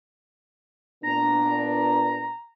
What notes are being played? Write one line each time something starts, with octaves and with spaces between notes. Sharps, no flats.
A#2 B3 D4 A#5